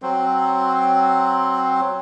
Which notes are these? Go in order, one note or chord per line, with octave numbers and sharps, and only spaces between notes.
F#3 C4